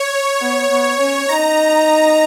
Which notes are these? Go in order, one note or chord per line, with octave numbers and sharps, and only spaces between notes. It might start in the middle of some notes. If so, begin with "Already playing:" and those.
Already playing: C#5
B3
B3
C#4
D#4 A#5